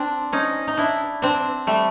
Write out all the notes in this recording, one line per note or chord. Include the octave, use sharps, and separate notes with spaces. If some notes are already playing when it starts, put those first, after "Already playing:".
Already playing: C4 D4
C#4 D#4
D#4
D4 E4
C4 D4
G3 A3